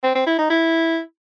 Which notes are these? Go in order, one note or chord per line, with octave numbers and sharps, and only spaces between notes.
C4
C4
E4
D#4
E4